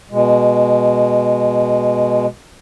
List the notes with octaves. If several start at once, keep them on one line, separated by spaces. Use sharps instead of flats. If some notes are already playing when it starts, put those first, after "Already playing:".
B2 G#3